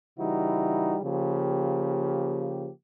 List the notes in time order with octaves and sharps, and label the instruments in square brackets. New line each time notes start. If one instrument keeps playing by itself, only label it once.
[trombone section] C#3 E3 G3 D#4 E4 F#4
C#3 F3 A#3 G4